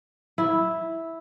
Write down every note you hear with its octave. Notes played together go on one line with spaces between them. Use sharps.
E4